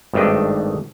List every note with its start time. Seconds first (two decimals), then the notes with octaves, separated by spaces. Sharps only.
0.14 G#1 G2 D#3 A3 D4 D#5